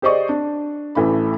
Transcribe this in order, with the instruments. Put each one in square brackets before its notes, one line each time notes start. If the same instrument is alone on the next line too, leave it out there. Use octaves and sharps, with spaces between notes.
[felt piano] G4 G#4 C5 D5 D#5 C#6
D4
A1 E3 A3 B5